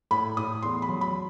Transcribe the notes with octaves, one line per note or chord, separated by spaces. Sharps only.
A2 B5
A2 D#6
E2 C6
B5
F#3
B5